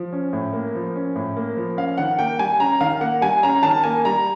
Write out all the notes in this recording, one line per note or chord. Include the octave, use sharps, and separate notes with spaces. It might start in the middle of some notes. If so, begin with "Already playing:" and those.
Already playing: F3
C#4
A2
A#3
F3
C#4
A2
A#3
F3
C#4 F5
D#3 F#5
A#3 G5
G3 G#5
C#4 A#5
D#3 F5
A#3 F#5
G3 G#5
C#4 A#5
D#3 A5
A#3 G#5
G3 A#5